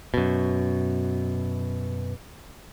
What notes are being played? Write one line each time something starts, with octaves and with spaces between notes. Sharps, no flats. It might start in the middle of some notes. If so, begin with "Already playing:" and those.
F#2 B2